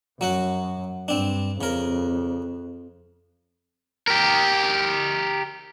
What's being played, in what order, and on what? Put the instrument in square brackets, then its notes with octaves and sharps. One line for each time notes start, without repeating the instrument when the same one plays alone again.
[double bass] F#2 [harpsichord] F#3 F#4 F#5
[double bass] G2 [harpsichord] C4 D4
[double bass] F2 [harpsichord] C#3 A#4
[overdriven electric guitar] G4 A#4